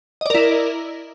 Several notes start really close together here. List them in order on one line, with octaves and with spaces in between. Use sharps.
D#5 D5 A#4 E4